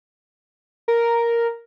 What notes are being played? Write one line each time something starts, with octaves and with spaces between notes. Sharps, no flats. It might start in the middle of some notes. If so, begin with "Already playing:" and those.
A#4